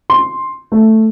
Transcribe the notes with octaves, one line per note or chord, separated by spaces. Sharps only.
C6
A3